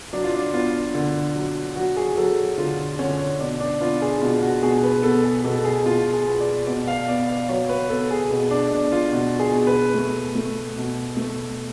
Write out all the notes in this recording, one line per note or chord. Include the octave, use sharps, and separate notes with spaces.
F#3 D4
F4
D4
B3 F4
D3
F#3
F#3 F#4
G#4
F#3 A4
D3 F4
D3 C#4
B2 D4
D4
B3 F4
G#4
B2 F4
F#4
B2 G#4
B4
B3 A4
G#4
B2 A4
G#4
B2 F4
G#4
B3
D5
B2 D5
F5
B3 D5
F5
F#3 C#5
B4
B3 A4
G#4
B2
D4
B2 D4
F4
B2 F#4
G#4
B2
B4
A3
A3
B2
A3